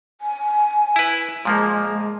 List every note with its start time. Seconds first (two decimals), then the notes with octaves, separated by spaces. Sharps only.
0.21 G#5
0.96 E4 B4
1.45 A#2 F3 G#3 A#3